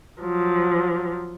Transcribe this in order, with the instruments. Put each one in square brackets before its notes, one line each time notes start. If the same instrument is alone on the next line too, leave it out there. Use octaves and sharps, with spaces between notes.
[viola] F3 F#3